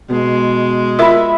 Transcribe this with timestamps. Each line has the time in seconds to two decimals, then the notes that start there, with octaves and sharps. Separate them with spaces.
0.10 B2 G#3
0.99 F4 A#4 E5 B5